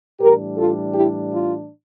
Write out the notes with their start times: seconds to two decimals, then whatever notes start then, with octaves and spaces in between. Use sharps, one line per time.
0.20 A2 E3 G3 D4 G4 A#4
0.57 F4 A4
0.94 E4 G4
1.32 F4